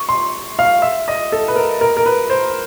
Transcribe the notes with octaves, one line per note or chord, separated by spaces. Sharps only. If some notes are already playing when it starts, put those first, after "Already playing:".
Already playing: C#6
C6
F5
E5
D#5
A4
B4
A#4
A#4
A#4
B4
C5